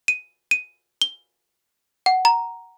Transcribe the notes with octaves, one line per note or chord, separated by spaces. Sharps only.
D#7
D#7
G7
F#5
A#5